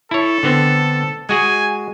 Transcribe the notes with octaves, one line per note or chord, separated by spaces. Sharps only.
E4 A4 C#5
D3 B3 C4
G#3 F#4 G#4 G#5